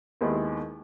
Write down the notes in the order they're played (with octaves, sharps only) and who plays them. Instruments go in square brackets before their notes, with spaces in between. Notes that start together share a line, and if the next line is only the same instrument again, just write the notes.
[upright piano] D#2 D#3 G#3 B3 E4